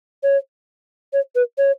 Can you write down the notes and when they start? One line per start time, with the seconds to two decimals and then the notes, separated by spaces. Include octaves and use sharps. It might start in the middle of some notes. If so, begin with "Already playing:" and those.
0.23 C#5
1.13 C#5
1.35 B4
1.58 C#5